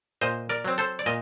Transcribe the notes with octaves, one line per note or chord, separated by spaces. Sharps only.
A#2 C5 D#5
A#4 D5
F#3 C4
A4 C5
D5
A#2 D#5